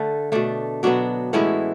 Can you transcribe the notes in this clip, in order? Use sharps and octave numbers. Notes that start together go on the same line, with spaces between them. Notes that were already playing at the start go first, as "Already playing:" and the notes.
Already playing: D3 A3
B2 A3 D4
B2 F#3 B3 D4 F#4
A2 E3 G#3 B3 C#4 E4